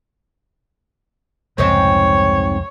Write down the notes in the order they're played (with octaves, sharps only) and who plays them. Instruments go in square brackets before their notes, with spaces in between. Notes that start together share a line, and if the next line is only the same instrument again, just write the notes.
[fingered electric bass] C2 F2 C#3 [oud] G#2 C4 D#4 [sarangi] C#5